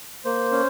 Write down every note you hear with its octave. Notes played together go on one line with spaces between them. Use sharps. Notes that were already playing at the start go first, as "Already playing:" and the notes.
A#3 C5
C#4